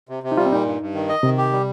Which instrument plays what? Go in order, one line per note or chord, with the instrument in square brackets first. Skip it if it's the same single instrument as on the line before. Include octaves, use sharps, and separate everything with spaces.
[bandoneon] C3
C3
[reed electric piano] D#4
[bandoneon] G3 [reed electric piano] F4
[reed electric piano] C4
[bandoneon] A#2 [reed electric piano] D#4
[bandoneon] G2
G2
D#3
D#5
[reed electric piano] C3 [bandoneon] D#3
[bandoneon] G4
G3